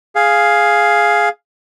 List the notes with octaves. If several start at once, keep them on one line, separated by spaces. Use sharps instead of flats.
G#4 F5